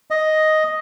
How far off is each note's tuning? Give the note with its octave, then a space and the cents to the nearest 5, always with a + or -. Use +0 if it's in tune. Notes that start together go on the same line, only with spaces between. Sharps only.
D#5 +5